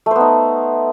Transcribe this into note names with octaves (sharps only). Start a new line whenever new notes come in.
A3 B3 D#4 C5